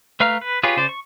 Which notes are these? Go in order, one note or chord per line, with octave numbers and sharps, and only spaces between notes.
A3 B4 F5 A#5 F6
B4
F4 G4 G#4 B4 C#5
C#3 C5 D5
C#6